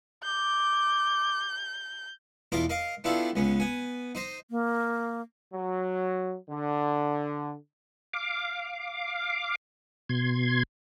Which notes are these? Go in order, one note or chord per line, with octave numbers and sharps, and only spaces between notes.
D6 G6
E2 B2 F4 A#4 D6
A#4 D#5 F5
B3 D4 E4 F4 G4 A4
C#2 B3 C#4
B3 G#5
D#4 C5 D#5
A#3
F#3
D3
F5 D6
B2 C6 G#6